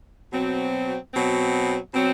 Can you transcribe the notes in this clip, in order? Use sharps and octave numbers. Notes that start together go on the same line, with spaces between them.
B2 F#3 C4
B2 F#3 C4
B2 F#3 C4